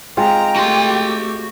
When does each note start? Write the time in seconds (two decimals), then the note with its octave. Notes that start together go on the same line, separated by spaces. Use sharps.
0.17 G#3 C4 F4 G5 A#5
0.56 A3 F#4 G4 C6